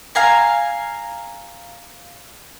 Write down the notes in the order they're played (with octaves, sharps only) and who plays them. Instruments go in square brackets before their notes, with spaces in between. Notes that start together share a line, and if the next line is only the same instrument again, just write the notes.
[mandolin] F5 G#5 A#5